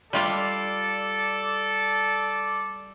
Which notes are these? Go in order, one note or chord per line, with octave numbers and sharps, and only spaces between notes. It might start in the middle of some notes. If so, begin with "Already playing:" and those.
G3 F4 A4 D5 F5